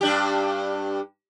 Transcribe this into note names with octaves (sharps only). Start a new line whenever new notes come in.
G2 D4 G4